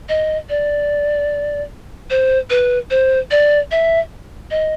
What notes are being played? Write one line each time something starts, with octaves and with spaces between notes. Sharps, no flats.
D#5
D5
C5
B4
C5
D5
E5
D#5